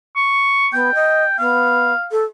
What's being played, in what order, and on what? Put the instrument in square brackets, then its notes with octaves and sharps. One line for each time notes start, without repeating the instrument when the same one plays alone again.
[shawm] C#6
[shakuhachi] B3 [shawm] G5
[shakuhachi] D#5
[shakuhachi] B3 [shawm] F5
[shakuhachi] A4